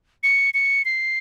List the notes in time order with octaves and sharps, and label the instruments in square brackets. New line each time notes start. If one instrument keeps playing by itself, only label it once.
[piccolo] C#7
C#7
C7